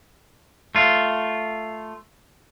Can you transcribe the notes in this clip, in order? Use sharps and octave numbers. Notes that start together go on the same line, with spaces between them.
A3 F4